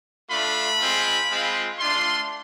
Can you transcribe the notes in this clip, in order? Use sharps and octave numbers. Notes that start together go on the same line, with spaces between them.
A3 D4 F4 B5
G#3 C4 F4
G#3 C4 F4
A3 D4 F4 C6